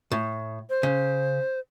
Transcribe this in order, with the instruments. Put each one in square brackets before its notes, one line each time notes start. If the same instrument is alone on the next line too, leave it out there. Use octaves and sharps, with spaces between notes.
[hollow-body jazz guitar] A2
[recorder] C5
[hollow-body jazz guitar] C#3